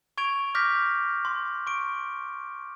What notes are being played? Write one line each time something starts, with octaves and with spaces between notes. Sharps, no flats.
C#6 G#6 D7 F7
D6 F6 G6 A#6 B6
C6
C#6 D7